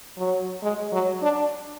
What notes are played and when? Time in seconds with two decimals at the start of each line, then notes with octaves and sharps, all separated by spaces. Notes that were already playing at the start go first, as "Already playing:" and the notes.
0.18 F#3
0.63 G#3
0.92 F#3
1.22 D4